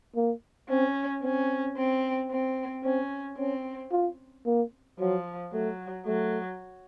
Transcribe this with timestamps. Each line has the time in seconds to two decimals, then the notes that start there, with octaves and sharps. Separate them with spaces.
0.16 A#3
0.69 C4 C#4
1.23 C4 C#4
1.77 C4
2.31 C4
2.84 C4 C#4
3.38 C4 C#4
3.92 F4
4.46 A#3
4.99 F3 F#3
5.52 F#3 A3
6.06 F#3 A3